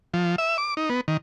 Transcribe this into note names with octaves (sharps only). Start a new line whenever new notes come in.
F3
E5
D6
D#4
B3
D#3